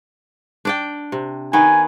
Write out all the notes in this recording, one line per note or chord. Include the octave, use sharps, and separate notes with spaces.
D4 D5 G5
C3
D#3 B3 G#5